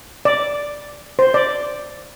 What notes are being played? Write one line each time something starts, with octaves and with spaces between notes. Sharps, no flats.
D5
C5
D5